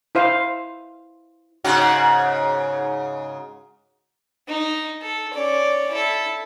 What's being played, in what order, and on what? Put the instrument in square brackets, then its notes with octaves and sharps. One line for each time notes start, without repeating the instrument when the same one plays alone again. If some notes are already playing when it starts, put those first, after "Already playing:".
[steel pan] E4 C5 F5
[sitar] G#2 C#3 F#4
[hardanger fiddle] D#4
A4
C#4 D5
E4 A4